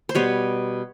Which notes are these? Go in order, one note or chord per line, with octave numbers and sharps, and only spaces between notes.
C5
B2 G3 B3 C#5